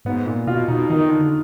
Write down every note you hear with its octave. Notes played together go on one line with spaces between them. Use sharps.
G#2 B3
A#2
B2 F4
B2 D#4
D#3 D#4
D3